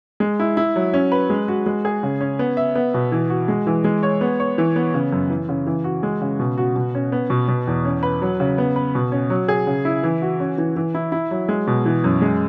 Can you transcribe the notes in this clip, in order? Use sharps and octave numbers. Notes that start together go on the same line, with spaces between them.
G#3
E4
E4
F#3
C#4
B4
G#3
F#4
G#3
G#4
C#3
C#4
B3
E5
B3
B2
E3
F#4
G#3
E3
G#3
C#5
B3
C#5
E3
B3
C#3
F#2
E3
C#3
E3
F#4
G#3
C#3
B2
F#4
B2
C#4
B3
B2
B2
E2
C#4
B4
F#3
C#3
B3
B4
B2
C#4
F#3
G#4
C#3
E4
E3
F#4
C#4
E3
E3
E4
E4
F#3
G#3
B2
E3
F#2
G#3